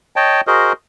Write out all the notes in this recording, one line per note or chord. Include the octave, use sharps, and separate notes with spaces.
C#5 D#5 G5 A5
F#4 G#4 A#4 C5 D#5